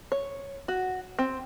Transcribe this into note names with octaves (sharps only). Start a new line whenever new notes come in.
C#5
F#4
C4